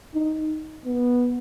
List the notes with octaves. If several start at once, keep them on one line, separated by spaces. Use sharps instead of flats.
D#4
B3